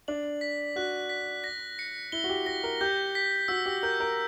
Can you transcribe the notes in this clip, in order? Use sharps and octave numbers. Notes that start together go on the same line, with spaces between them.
D4 F#7
B6
F#4 F#6
B6
A#6
C#7
E4 G7
F#4
G4
G4 A#6
A#4
G4 G6
B6
F#4 E6
G4
A#4 G6
A#4